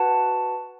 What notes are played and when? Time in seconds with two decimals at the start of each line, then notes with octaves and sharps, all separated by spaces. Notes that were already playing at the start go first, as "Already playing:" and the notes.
Already playing: F#4 B4 F#5 A5